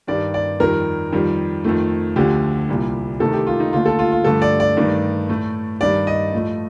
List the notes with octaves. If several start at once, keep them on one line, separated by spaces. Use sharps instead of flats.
G2 D#3 G3 D5
D5
F2 D#3 G3 A#4
F2 D#3 G3
F2 D#3 A3
D2 D3 F3 G4
C2 A#2 G3
C2 C3 D#3 A3 A4
G4
F4
D#4
D#2 D3 A3 F4
A4
F4
F4
G2 D3 F3 A3 A4
D5
D5
G2 D#3 A3
A2 A3
G2 D#3 G3 D5
D#5
A2 F3 A3